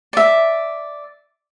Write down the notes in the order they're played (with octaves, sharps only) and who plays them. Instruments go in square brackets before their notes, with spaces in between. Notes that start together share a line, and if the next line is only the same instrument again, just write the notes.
[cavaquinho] D5 E5